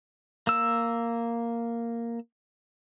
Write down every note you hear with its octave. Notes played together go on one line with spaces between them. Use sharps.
A#3 E6